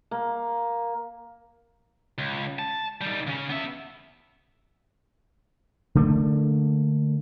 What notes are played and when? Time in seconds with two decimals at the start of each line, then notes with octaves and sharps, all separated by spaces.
0.11 A#3
2.18 C#2
2.59 A5
3.01 D#3 G3
3.27 C#3 C#4
3.49 B3 E5
5.95 D3 A3 A#3